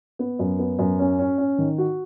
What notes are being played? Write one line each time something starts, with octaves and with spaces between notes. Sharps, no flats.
B3
F#2
B3
F#2
C#4
C#4
C#4
D#3
F#4